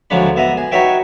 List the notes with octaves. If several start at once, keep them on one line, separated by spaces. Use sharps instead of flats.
D2 F3 F#3 G#3 D4 B5
B3 E5 A#5 D#6
G#4
D#4 F#4 B4 C#5 E5 G5